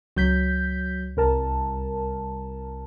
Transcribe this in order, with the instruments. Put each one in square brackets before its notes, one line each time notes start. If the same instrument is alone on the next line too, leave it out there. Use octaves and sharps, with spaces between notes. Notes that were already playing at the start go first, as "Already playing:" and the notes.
[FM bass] C#2 [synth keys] F#3 G6 B6
[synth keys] C2 A#4 A5